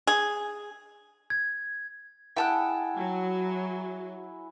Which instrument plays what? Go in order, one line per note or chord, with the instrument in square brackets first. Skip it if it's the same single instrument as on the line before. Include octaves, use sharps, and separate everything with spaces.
[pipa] G#4
[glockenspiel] G#6
[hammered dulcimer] E4 G#4 F#5 [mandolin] G5 A5 F#6
[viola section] F#3